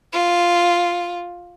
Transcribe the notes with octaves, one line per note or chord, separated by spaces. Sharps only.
F4